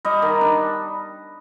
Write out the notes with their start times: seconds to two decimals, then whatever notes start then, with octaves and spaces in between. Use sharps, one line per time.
0.05 G3 D#5
0.22 D#3
0.41 D4